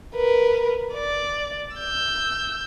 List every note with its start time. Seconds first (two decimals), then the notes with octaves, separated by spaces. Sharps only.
0.15 A#4 B4
0.94 D5
1.76 E6 G6